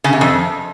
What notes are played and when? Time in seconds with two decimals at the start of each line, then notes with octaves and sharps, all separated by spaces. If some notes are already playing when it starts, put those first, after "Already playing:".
0.04 C#3
0.13 C3
0.21 F2